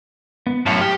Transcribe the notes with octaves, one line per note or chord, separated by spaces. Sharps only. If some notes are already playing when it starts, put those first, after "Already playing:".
B3
F#2 A2 C#5 F5 A5
G4 D#6 F6